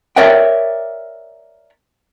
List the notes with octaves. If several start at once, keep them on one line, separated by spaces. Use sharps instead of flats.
A#4 C#5 D5 E5 F#5 G5